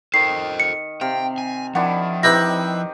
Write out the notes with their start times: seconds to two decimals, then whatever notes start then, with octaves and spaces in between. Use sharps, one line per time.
0.14 D#3 A4 C5 C7
0.60 C#7
1.01 C3 F5 G5
1.38 G#5
1.75 D#3 F3 D4 E4 F#5
2.23 C4 D#4 E4 G4 B4 E5 A#6